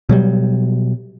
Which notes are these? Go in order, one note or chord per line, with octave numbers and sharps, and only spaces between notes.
B2 F#3 G3